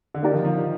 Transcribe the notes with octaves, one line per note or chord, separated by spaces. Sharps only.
D3
D#3 A#3 D#4 G4 A#4 D5
F3
F3
D#3